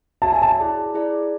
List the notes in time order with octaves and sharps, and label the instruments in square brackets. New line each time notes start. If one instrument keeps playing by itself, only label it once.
[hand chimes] F#4 C#5 E5 [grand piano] A5
[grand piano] G#5
A5
[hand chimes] E4 G#4 D5
E4 G#4 D5